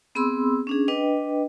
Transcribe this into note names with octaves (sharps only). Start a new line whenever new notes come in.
B3 C4 G#4 B5 C6 E6
C#4 D4 G#4
D4 B4 D#5 G5